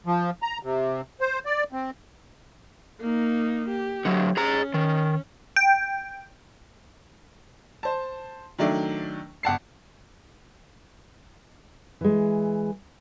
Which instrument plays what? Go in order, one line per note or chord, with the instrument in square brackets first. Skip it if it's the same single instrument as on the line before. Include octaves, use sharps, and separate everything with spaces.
[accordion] F3
A#5
C3
C5
D5
C4
[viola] A#3 D#4
G4
[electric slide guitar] D3 F#3
[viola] C#4 [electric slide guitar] G#4 A#5
[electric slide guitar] D#3
[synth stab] G5
[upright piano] C5 A5
D#3 F#3 A3 D4
G1 F#5 A5 C7
[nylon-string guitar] E3 G#3